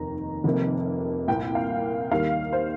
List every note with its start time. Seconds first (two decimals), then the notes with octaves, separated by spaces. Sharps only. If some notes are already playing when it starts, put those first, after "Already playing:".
Already playing: F1 D#2 D#3 A#5
0.44 F1 F2 C3 D#3 A#3
1.28 C2 A#2 A#3 G5
1.55 F5
2.11 D#2 D#3 G3 A#3 F5
2.53 C5